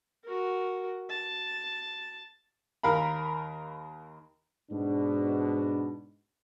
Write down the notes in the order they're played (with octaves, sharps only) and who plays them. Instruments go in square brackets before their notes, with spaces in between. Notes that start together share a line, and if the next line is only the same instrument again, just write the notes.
[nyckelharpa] F#4 A#4
A5
[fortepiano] D#2 A#4 F5 B5
[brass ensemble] G#2 B2 D4